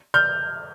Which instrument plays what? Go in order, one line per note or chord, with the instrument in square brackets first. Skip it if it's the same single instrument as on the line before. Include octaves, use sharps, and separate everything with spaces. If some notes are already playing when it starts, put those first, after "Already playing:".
[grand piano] F6 G6